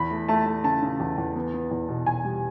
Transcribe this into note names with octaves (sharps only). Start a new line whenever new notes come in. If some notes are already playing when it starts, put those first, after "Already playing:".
Already playing: E2 B5
A3
A3 A5
A3
C#3 A5
C#3
E2
E2
B3
B3
E2
B2
E2 G#5
G3